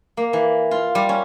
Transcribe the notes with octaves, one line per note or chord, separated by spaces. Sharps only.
A#3
E3
F4
G3
C#4